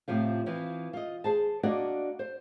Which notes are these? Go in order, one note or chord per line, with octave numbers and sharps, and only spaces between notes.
A2 C3 F3 F4
E3 F3 C4
F4 D#5
G#4 C5 A5
A#3 D4 F#4 D5 D#5 F#5
C5